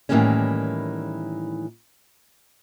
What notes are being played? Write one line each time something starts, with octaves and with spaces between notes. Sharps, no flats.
A2 D#3 E3 G3 A#3 C#4